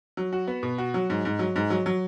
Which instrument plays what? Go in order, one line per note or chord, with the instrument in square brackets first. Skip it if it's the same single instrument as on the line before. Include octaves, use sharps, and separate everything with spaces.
[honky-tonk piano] F#3
F#4
B3
B2
F#4
F#3
G#2
G#2
F#3
G#2
F#3
F#3